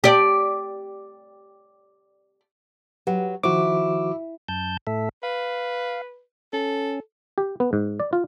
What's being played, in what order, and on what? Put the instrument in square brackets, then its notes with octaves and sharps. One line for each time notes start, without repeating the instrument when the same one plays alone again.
[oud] G4 D5
[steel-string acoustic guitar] F#3 [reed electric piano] G4 B4 F#5
[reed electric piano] D#3 F3 C5 [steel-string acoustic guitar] E4 [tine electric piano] F#4 D6
[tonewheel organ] F#2 A5 G6
A2 A4 E5
[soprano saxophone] B4 [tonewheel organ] F5
[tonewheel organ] C#4 [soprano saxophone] A4
[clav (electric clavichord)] G4
B3
G#2
D5
F4